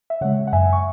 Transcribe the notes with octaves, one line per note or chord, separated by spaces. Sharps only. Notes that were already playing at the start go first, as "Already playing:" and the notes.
E5
C#3 G#3 C#5 F#5
F#5
F#2 E5 G#5
C#6